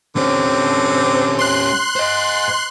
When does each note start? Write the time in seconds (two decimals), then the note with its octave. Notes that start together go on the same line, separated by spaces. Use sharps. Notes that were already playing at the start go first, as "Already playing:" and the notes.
0.16 D3 G3 C4 C#4
1.39 C6 F#6
1.96 C5 D#5